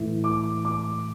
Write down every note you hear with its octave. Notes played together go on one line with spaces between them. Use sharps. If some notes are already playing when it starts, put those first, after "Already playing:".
Already playing: A2 E3
D6
D6